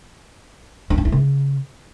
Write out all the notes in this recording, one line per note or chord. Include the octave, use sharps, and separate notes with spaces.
D4
C#4
E4
C#3